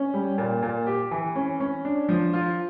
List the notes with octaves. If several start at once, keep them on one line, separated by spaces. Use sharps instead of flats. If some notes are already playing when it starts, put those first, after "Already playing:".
Already playing: C#4
G3
A#2
A#2
G4
E3
C#4
C#4
D4
F3
F4